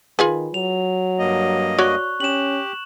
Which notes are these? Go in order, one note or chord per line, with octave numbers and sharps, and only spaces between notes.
D#3 F4 G#4 B4
F#3 F7
G2 A#3 D#5
F#4 C#5 D5 C#6 F#6
C#4 G4 E7 F#7